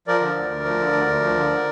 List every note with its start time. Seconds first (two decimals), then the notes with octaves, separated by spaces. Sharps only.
0.07 F3 A#4 D5
0.21 D3
0.36 D2
0.51 D2
0.65 F3
0.79 D3
0.93 D2
1.07 D2
1.22 F3
1.36 D3